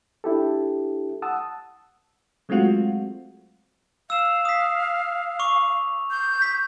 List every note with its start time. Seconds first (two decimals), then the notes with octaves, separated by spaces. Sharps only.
0.24 D4 E4 G4 A4
1.22 F#5 A5 D#6 E6
2.49 F#3 G#3 A3 C4 F4 F#4
4.10 F5 E6 E7
4.45 D#6 B6
5.39 C#6 D6 F7
6.11 G6
6.42 B6